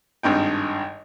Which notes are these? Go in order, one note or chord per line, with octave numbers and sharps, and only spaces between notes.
G#1 G2 D#4 G5